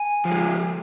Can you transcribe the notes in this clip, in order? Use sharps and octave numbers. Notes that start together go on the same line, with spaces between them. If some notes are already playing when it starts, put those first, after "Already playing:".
Already playing: G#5
F3
G#3